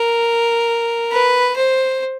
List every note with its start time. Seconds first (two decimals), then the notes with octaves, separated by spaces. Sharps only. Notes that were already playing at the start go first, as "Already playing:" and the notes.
Already playing: A#4
1.11 B4
1.56 C5